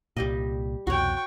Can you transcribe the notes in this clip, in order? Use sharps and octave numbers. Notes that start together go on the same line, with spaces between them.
C2 A#2 G3 G4 D#5
C2 F2 B2 F#4 C#5 G5 C#6